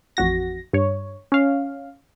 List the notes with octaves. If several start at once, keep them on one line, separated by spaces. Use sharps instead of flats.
A1 F2 F#4 A#6
G2 C#5
C#4 F5